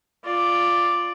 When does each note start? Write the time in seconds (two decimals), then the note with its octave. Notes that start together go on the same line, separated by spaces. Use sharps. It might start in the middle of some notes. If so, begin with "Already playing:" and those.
0.24 F4 D5